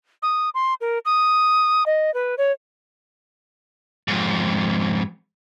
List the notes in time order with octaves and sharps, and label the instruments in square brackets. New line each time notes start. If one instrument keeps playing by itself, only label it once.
[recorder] D#6
C6
A#4
D#6
D#5
B4
C#5
[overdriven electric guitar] F2 G#2